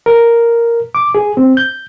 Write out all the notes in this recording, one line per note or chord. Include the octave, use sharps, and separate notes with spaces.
A#4
D6
G#4
C4
G6